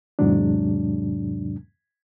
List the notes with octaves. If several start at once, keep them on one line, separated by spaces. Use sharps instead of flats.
E2 G#2 C3 F#3 G#3 D4